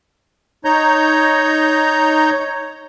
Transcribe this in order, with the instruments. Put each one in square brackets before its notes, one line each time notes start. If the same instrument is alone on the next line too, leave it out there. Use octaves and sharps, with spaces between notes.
[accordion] D#4 C#5 A#5 G6